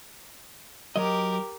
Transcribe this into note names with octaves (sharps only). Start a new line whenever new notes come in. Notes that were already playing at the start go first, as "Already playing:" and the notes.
F#3 G4 A#4 D#5